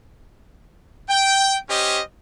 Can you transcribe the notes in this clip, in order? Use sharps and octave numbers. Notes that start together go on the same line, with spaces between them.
G5
C#4 G4 C5 D#5